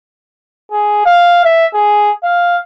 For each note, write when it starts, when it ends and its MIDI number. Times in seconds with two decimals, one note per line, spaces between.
0.72 1.04 68
1.06 1.41 77
1.44 1.66 76
1.74 2.11 68
2.24 2.58 77